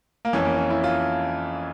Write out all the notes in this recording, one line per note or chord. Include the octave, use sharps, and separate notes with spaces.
A#3
F2 E3 C#4
A#3
C#4
E4
F4